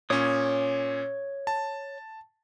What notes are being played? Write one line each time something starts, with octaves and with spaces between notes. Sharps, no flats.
A#2 C#4 C#5 D#6
A5